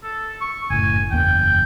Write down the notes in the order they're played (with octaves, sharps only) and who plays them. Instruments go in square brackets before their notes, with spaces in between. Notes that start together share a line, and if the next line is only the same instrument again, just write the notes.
[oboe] A4
C#6
[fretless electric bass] F#1 A2 [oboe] G#5
[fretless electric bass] F#1 E2 A#3 [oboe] G5